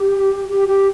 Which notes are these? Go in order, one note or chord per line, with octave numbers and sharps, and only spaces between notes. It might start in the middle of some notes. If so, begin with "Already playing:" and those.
Already playing: G4
G4
G4